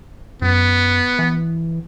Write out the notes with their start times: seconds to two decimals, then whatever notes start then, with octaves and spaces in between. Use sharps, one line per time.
0.42 F#2 B3
1.19 E3